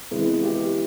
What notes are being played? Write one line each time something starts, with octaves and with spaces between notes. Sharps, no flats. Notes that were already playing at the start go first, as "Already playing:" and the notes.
C3 E3 G#3 B3
G4